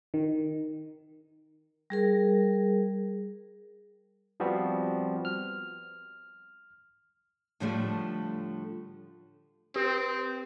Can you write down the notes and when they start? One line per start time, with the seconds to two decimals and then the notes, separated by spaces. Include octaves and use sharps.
0.14 D#3
1.90 G3 G#4 A#4
4.40 F3 G3 B3 C4 F#4
5.25 F6
7.60 A2 D3 F3 G3 A3
9.76 C4 G4